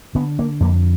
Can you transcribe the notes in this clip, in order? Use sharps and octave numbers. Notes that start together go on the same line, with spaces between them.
D3 B3
A#3
F2 A#3